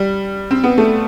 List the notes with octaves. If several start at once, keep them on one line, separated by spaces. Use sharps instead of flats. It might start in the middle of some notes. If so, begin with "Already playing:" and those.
Already playing: G3
C4
B3
A3